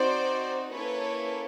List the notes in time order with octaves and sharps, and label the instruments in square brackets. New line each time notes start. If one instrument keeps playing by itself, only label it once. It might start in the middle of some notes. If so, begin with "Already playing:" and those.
Already playing: [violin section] C4 D#4 F#4 C5 D5
A#3 C#4 E4 A4 B4 C#5